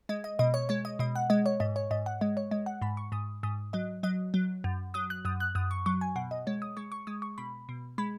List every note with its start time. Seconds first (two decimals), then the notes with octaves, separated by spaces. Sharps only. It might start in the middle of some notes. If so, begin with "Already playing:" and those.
0.09 G#3 D#5
0.24 D#5
0.39 B2 D#5
0.54 C#5
0.69 G#3 C#5
0.85 D#5
0.99 B2 D#5
1.15 F#5
1.30 G#3 D#5
1.46 C#5
1.60 G#2 D#5
1.76 C#5
1.91 G#2 D#5
2.06 F#5
2.21 G#3 D#5
2.37 C#5
2.51 G#3 D#5
2.66 F#5
2.82 G#2 B5
2.97 C#6
3.12 G#2 D#6
3.43 G#2 D#6
3.73 F#3 D#5
4.03 F#3 D#5
4.34 F#3
4.64 F#2
4.94 F#3 D#6
5.10 F#6
5.25 F#2 D#6
5.40 F#6
5.55 F#2 D#6
5.71 C#6
5.86 F#3 C#6
6.01 G#5
6.16 B2 F#5
6.31 D#5
6.47 G#3 C#5
6.62 D#6
6.77 G#3 C#6
6.92 C#6
7.07 G#3 D#6
7.22 C#6
7.38 B2 B5
7.69 B2
7.98 G#3 B5